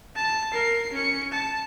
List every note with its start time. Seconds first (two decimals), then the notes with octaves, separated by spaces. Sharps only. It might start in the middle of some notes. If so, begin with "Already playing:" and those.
0.16 A5
0.53 A#4 C7
0.93 C#4 C#7
1.32 A5